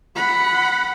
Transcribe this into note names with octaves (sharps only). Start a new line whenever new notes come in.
F#5 B5